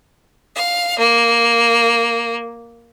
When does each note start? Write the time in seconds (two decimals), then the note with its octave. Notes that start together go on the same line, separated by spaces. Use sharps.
0.55 F5
0.99 A#3